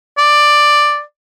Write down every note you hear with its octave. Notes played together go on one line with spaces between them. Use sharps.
D5